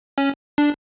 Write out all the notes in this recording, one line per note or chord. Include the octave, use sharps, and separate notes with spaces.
C#4
D4